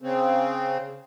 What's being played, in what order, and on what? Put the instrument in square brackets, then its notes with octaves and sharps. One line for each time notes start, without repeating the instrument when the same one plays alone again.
[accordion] C#3 C4